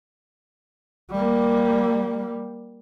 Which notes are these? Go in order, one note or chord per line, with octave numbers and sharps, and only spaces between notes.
G3 A#3